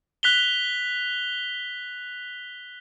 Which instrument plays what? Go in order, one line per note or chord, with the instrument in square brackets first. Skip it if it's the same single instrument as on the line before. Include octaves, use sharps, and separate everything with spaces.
[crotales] F#6 B6 F7 G7